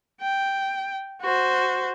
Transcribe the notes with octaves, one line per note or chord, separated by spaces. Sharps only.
G5
F#4 C5